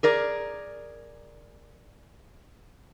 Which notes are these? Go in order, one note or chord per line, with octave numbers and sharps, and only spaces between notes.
G#4 A#4 D5